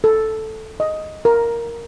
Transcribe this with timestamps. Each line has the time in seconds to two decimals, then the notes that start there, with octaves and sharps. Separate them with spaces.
0.04 A4
0.80 D#5
1.25 A#4